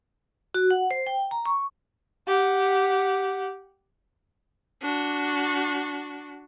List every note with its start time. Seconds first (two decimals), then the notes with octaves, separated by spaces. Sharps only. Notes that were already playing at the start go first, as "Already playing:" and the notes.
0.54 F#4
0.71 F#5
0.91 C5
1.07 G5
1.31 A#5
1.46 C#6
2.27 G4 F#5
4.82 D4 F#4